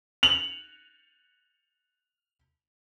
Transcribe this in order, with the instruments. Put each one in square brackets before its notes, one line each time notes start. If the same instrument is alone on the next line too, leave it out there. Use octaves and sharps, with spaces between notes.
[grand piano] F7 F#7